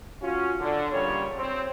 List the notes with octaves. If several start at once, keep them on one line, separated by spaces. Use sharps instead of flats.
C#4 F4 F#4
D3
G2 A#2 C#3 G3 C#5
C4